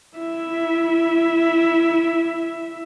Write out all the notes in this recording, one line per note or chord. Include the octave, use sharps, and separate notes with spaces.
E4 E5